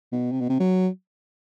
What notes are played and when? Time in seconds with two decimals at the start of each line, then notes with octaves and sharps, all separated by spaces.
0.12 B2
0.32 C3
0.41 B2
0.49 C3
0.60 F#3